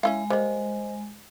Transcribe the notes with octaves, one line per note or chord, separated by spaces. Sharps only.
G#3 C#4 E4 F5
G3 A#3 C5 D#5